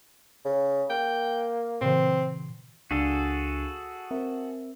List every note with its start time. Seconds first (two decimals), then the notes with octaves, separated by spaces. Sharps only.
0.45 C#3
0.90 A#3 G5
1.81 A#2 C#3 E3 C4
2.91 C#2 D4 F#4 G#4 A4 F5
4.11 C4 A#4 E5